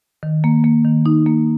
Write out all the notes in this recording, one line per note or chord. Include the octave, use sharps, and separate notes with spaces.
D#3
A#3
A#3
D#3
D#4
A#3